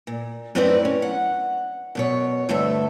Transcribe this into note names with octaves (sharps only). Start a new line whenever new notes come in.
A#2
F#2 A2 C4 D#4 B4 D5
C#4
F#5
F#2 B2 C#5
D2 G2 A3 A4 E5